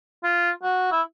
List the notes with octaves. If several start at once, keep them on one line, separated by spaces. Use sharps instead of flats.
F4
F#4
E4